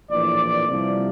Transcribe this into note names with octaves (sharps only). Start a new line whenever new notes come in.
A#1 A2 E3 D5
C2 C3 F3